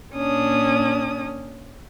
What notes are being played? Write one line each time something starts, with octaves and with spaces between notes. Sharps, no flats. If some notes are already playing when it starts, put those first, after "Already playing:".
A#2 C#4 D4 D#6